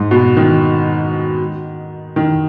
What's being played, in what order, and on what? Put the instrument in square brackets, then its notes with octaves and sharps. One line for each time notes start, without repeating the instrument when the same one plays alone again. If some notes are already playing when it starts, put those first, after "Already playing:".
Already playing: [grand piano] G#2
B2
D#3
D#3